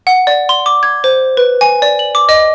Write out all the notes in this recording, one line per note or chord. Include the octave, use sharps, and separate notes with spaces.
F#5
D5
C6
D6
G#6
C5
B4
G#5
D5
F#7
D6
D#5